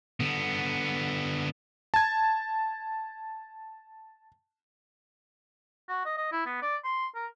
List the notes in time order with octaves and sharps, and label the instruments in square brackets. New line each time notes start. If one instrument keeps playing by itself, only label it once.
[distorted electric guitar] D3 B3
[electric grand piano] A5 G#6
[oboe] F#4
D#5
D#5
E4
B3
D5
C6
A#4